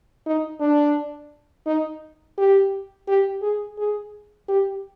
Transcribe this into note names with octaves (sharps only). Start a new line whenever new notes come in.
D#4
D4
D#4
G4
G4
G#4
G#4
G4